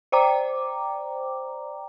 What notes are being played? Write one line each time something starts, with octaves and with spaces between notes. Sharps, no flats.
C5 D5 G5 A#5 D6